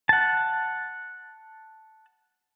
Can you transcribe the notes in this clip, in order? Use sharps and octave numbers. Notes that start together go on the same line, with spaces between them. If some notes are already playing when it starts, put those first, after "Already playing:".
F#5 A5